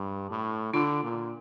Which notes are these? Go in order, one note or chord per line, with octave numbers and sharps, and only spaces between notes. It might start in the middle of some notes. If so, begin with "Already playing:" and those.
Already playing: G2
A2
D3 D4 F4
A#2